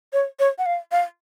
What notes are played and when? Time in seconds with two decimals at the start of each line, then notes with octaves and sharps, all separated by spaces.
0.13 C#5
0.39 C#5
0.58 F#5
0.66 F5
0.92 F5